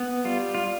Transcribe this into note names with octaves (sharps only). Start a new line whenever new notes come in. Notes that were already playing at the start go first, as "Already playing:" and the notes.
Already playing: B3
G3 F4
F4